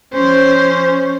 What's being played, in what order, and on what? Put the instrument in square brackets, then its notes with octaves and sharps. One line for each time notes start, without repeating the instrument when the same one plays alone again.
[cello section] F3 C#4 [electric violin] C5